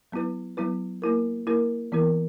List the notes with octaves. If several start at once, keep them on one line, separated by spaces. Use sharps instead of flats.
F#3 B3 E4 B4
F#3 B3 E4 B4
A#3 E4 A#4
A#3 E4 A#4
E3 B3 E4 A#4